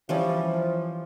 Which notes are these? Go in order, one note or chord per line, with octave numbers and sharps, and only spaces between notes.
E3 F3 G3 C#4